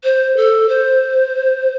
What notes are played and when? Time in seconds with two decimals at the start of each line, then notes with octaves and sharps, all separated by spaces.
0.04 C5
0.36 A4
0.69 C5